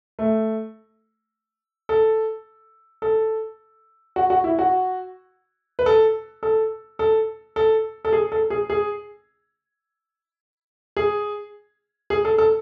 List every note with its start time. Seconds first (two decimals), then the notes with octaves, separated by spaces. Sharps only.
0.19 A3
1.89 A4
3.02 A4
4.16 F#4
4.30 F#4
4.44 E4
4.59 F#4
5.79 B4
5.86 A4
6.43 A4
6.99 A4
7.56 A4
8.05 A4
8.13 G#4
8.32 A4
8.50 G#4
8.70 G#4
10.97 G#4
12.10 G#4
12.25 A4
12.38 A4